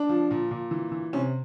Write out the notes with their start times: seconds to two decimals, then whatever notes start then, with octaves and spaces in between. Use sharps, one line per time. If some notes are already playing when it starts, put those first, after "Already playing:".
Already playing: D4
0.09 F3
0.31 A#2
0.51 A#2
0.71 E3
0.92 E3
1.13 C3 C#4